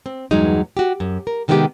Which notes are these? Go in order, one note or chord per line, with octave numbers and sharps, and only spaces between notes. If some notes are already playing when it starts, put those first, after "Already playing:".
C4
E2 G2 F#3 G#3 D#4
F#4 G4
F#2
A#4
C3 D#3 G#3 B3 E4 G4